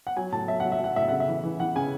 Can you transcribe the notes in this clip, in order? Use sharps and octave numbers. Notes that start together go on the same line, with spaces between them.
F#5
F#3 G#5
A2 A5
F#3 E5
F#3 F#5
E5
F#3 F#5
A2 E5
C#3 F#5
E5
E3
E3
E3 F#5
C#3 G#5